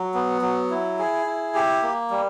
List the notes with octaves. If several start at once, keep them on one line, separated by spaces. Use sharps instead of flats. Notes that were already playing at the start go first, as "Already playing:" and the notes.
Already playing: F#3
B3
F#3
E4
G#4
E4
G4
A#3
G3